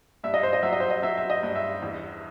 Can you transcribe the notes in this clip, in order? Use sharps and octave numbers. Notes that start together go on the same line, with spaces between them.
G2 E5
D#5
C5
D#5
F#3 E5
D#5
C5
D#5
F#3 E5
E5
D#5
G2
E5
E2